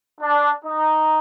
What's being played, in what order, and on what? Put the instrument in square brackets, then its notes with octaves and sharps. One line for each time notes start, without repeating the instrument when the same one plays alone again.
[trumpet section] D4
D#4